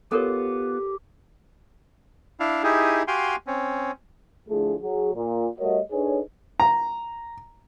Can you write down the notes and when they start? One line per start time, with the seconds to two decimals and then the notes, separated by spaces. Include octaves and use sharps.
0.12 B3 F4 G4 A4 A#4 C#5
2.40 D4 E4 F5
2.63 D#4 E4 G4 G#4
3.08 F#4 G4 F5 G5 G#5 C6
3.47 C4 C#4
4.49 D3 F3 A3 E4 G#4
4.81 F#3 G#4
5.14 A#2
5.59 G3 A3 F#4 A#4 C#5 D#5
5.91 D4 D#4 G#4 A4 B4 C#5
6.60 A#5